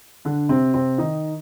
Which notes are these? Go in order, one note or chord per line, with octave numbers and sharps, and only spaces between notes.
D3 D4
C3 C4
C3 C4
D#3 D#4